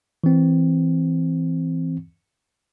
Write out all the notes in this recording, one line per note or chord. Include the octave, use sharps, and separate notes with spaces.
E3 C4